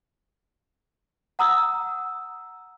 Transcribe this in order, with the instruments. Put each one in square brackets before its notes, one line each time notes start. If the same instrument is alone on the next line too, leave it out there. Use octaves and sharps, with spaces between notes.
[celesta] F#5 A#5 D#6 E6